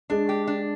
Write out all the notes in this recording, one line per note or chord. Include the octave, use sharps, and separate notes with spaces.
G#3 D4
G4
D4